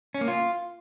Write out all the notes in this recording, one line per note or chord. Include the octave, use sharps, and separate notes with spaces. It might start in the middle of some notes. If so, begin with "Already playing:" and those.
C#4
A#3
F4